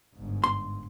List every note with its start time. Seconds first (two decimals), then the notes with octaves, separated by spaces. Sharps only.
0.14 G1 G#2
0.44 C6